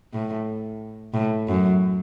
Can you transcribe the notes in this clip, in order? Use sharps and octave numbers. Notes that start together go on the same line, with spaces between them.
A2
A2
F#2